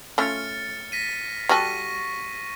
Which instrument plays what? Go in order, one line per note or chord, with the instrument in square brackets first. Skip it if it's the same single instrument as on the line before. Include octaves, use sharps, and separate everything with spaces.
[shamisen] A3 C#4 F4 [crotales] F6 A6 C#7
[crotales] A#6 B6 D#7
[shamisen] G3 F#4 A4 [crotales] C#6 A#6 D#7